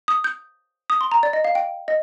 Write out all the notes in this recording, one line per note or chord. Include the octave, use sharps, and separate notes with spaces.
D#6
G6
D#6
C6
A#5
D5
D#5
F5
G5
D#5